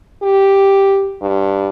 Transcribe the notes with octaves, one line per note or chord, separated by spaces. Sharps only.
G4
G2